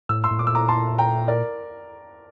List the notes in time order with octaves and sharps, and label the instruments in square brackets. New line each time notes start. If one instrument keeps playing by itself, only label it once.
[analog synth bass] A2 [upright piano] E6
[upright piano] C6 E6
[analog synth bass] A2
[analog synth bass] A#2 [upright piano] D6
[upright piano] E6
A#5 D6
A5 C6
G5 A#5
A#4 D5